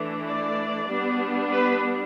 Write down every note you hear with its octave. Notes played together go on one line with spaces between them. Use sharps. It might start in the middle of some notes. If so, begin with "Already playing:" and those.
Already playing: E3 A3 D4
D5
G3 B3 D4
B4